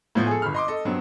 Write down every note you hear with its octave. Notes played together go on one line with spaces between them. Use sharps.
A2 F3 B3
G#4 A4
G1 B5 F6
D#5 C6 D6
A4 D#5
G2 F#3 B3 C4